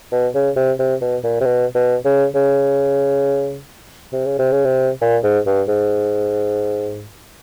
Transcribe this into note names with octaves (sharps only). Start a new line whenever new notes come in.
B2
C#3
C3
C3
B2
A#2
C3
B2
B2
C#3
C#3
C3
C#3
C3
C#3
C3
A#2
G#2
G2
G#2